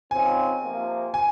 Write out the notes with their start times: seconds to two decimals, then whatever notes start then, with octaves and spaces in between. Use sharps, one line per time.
0.11 C#3 F3 C4 D#4 G#5
0.63 C3 F3 A#3
1.14 G#5